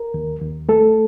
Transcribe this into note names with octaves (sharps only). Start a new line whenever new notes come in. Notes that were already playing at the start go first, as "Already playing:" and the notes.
Already playing: A#4
D#2
D#2
A3 A4